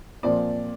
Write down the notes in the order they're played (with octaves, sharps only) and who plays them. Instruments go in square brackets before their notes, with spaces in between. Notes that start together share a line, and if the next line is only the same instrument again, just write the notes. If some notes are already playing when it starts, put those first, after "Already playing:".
[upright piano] A#2 F3 C4 D5